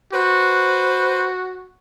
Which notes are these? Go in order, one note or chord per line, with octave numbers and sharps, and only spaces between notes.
F#4 B4 C5